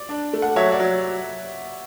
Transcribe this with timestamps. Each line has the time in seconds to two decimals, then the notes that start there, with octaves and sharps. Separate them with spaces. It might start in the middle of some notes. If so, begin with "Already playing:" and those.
Already playing: D5
0.09 D4
0.33 A3
0.42 F#5
0.56 F#3 C#5 E5
0.72 D5 F#5
0.80 F#3